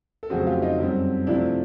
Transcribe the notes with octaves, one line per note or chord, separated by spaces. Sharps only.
A4
F2 C#3 F#3 A3 C4 F#4 G#4
F4 G4
D#4 F4
F#2 D3 G3 C4
C3 F3 A3 C4 D4 E4